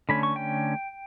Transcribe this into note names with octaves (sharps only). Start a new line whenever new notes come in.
D3 A3 C#4 B5
C#6
G5